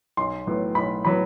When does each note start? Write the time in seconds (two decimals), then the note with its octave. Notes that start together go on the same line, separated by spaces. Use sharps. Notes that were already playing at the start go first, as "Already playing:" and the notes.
0.17 B1 C6
0.47 A2 F#3 B3
0.75 B1 B5
1.05 A2 F#3 B3 B5